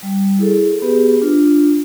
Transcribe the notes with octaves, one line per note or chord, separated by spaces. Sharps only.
G3
E4 G#4 A4
B3 G4 G#4 B4
D4 F4